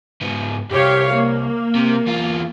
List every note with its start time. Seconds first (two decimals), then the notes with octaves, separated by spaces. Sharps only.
0.21 G#2 B3
0.71 C2 G#2 G4 C#5 F5
1.12 A#3
1.75 C3
2.07 E2 F4